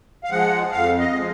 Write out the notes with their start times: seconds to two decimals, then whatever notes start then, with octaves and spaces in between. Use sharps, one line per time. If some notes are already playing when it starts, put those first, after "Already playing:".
0.24 F5
0.30 F3 G#3 F#5
0.72 F2 F5
0.99 D#5
1.13 F3 G#3